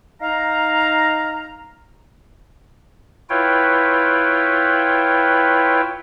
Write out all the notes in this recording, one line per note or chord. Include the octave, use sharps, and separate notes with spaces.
D#4 F5 A#5
E4 F4 B4 C#5 G5